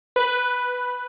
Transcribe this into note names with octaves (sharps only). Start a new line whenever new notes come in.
B4